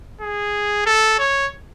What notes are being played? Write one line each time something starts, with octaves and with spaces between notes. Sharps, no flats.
G#4
A4
C#5